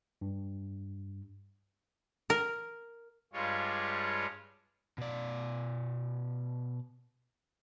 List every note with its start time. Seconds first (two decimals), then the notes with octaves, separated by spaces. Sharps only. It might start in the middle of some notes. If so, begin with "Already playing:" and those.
0.21 G2
2.30 A#4
3.33 G2 G3 G#3 F4 C#5
4.98 B2 D5